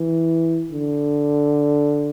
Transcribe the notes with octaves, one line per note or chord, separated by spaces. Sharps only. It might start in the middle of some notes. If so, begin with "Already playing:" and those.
Already playing: E3
D3